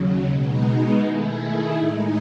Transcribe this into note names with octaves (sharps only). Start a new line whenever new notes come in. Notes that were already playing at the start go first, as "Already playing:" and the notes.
Already playing: D#2 C#3 F#3
B2 G#3 B3 D#4
D#3 A3 E4 G#4
A2 G#3 D#4